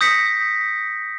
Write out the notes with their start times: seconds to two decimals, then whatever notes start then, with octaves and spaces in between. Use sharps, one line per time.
0.01 D#6 G6 A#6 B6 C#7